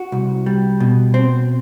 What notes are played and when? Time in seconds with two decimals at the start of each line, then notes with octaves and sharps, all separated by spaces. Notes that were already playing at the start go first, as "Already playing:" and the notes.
Already playing: F#4
0.12 C2
0.46 G3
0.80 B2
1.14 C4